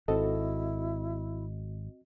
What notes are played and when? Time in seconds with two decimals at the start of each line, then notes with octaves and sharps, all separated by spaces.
0.08 G#1 C4 E4 F#4 A4 D#5